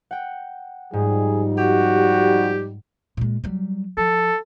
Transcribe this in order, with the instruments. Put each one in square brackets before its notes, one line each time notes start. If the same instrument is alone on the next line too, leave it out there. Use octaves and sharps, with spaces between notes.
[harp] F#5 G5
[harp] G#2 [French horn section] F3 G3 D#4 [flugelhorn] G#4
[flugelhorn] F#4 [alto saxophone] G4
[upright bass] A#2 G#3
F#3 G3
[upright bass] F3 [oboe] A4